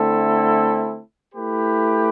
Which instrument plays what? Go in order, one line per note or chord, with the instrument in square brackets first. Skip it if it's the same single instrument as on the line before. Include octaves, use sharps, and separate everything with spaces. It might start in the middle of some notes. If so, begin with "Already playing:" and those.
Already playing: [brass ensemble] D3 A3 C4 E4 A4
A3 E4 G4 B4